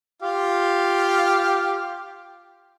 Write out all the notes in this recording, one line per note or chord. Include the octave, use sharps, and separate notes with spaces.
F4 G4 F5